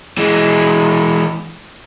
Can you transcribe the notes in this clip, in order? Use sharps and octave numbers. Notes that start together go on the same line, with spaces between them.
E3 G#3